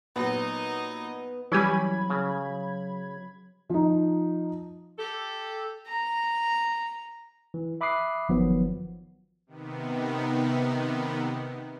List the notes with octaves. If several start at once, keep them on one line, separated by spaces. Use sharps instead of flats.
A#2 F#3 B3 D#4 D#5
E3 F#3 G3 C#4 G#5 B5 G#6
C#3
F3 D#4
G4 A4
A#5
E3
E5 B5 D6 D#6 F#6 C7
G1 D#3 F3 F#3 B3
C3 D#3 B3